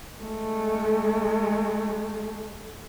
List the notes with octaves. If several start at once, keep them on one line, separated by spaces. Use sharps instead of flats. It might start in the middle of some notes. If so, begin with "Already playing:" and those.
G#3 A3